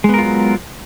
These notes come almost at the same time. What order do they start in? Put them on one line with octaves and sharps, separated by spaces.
G#3 B3 A#4 F4 F#3